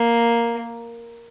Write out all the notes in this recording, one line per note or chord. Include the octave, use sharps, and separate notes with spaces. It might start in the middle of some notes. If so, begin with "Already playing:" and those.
Already playing: A#3